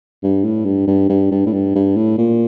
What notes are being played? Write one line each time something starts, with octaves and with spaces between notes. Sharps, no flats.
G2
A2
G2
G2
G2
G2
A2
G2
G2
A2
A#2